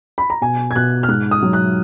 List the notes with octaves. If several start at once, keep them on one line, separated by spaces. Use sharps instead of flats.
B5
A#5
B2 G#5
G#6
B2 F#6
F6
G#2 F#6
D#6
F#3
F#6